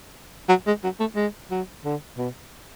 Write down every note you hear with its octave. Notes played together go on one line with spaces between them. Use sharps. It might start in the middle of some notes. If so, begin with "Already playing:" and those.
F#3
G#3
F#3
A3
G#3
F#3
D3
B2